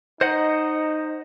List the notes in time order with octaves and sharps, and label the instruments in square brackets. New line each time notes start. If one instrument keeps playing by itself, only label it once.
[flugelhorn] D#4 [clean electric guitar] C5 D#5 F#5